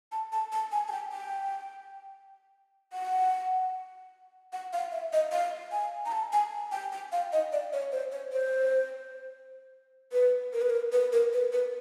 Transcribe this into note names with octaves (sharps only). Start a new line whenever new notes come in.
A5
A5
A5
G#5
G#5
G5
G5
F#5
F#5
F5
E5
D#5
F5
G#5
A#5
A5
G#5
G5
G5
F5
D#5
D5
C#5
C5
C#5
C5
B4
A#4
B4
A#4
B4
A#4
B4
B4